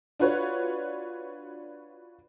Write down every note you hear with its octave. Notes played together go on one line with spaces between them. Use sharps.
D4 F4 F#4 B4 C#5